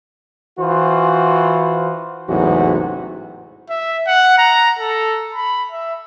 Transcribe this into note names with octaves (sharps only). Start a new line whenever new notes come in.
E3 F4 F#4 C5
A1 E2 G#2 C3 F#3 F#4
E5
F#5
A#5
A4
B5
E5